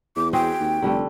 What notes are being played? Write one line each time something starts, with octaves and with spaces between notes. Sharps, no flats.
E2 D6
C4 F#4 G#4 G5
D#2
F1 D3 G3 A3